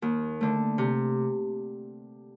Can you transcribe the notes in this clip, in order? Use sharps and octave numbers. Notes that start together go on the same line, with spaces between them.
D#2
D3 A3
C3